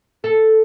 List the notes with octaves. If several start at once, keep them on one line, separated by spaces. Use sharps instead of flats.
A4